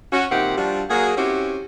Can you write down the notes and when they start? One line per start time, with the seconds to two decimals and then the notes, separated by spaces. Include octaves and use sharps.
0.12 C#4 F#4
0.31 A#2 D#3 C4 G4 E5 F#5
0.58 F3 G3 D4 F4 F#4
0.90 F#3 A#3 F#4 G#4
1.17 C4 C#4 E4 F#4 G4